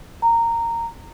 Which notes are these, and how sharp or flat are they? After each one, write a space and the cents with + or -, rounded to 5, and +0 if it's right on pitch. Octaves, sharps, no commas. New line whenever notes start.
A#5 -15